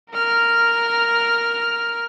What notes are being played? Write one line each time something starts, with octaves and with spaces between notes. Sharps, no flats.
A#4 F6